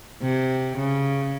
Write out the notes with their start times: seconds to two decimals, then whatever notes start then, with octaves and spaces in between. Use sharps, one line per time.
0.21 C3
0.77 C#3